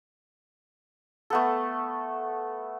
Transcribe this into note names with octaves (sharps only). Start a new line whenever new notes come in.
A3 B3 A4